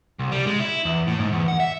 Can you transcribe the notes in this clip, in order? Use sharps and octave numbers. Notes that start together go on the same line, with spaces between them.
C2
G3
G#3
E4
E2
A2
G#2
E2
F#5
E5